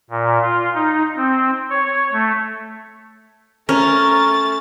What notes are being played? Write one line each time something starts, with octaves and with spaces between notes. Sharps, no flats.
A#2
F4
D#4
C4
C#5
A3
A3 C#4 A#4 A6